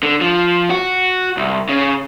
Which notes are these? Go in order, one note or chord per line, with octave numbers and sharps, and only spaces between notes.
D3
F3
F#4
C2
C#3